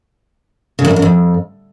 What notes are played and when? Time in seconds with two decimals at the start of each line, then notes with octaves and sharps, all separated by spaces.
0.79 C#3
0.85 F#2
0.90 F2
0.96 F#2
1.02 F2